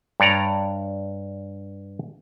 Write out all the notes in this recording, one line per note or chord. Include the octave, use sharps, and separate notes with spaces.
G2 C#5 D5 A#5